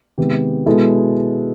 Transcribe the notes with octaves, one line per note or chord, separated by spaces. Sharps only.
C3 D#3 G#3 B3 G4
B2 G#3 B3 E4 A4